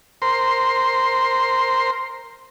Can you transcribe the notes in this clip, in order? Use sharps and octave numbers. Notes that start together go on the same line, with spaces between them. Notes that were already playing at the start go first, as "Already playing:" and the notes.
A#4 C5 C6